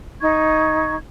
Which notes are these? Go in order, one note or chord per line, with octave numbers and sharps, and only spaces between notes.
D#4 C#6 G#6